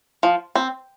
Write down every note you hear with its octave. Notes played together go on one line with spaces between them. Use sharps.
F3
C4